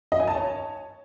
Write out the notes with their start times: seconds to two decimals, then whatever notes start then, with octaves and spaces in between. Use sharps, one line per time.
0.12 D#5
0.20 G#5
0.27 A5
0.35 C#5